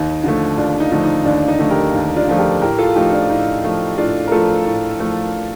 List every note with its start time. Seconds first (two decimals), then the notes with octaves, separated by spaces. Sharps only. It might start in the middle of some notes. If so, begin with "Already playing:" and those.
Already playing: D#2 D#4
0.24 D3 F3 A3
0.57 D#2 D4 F4
0.80 D#4
0.92 D3 F3 A3
1.03 D#4
1.25 D#2 D4
1.48 D#4
1.59 D3 F3 A3
1.71 G4 A#4
1.94 D#2
2.16 D4 F4
2.28 D3 F3 A3
2.39 G4 A#4
2.62 A2 G4 A#4
2.79 F4 A4
2.96 F3 A3 D#4 G4
3.13 D4 F4
3.30 A2 D#4
3.64 F3 A3
3.98 A2 D4 F4
4.28 A#4
4.32 F3 A3 F4 A4
4.65 A2
5.00 F3 A3